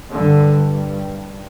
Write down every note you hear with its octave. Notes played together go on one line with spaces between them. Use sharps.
G2 D3